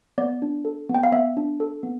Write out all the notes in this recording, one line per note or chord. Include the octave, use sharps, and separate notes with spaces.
B3 D5
D4
A4
B3
G5
F5
B3 E5
D4
A4
B3